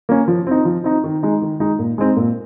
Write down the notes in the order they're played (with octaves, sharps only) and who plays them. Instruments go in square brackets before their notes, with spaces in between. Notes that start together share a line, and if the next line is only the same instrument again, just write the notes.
[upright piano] A#3 C#4
F3
C4 D#4
F3
C4 D#4
D#3
G#3 D#4
D#3
G#3 D#4
A#2
G#3 C4 D#4
A#2